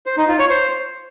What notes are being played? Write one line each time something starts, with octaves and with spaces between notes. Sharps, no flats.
C5
D#4
F4
C#5
C5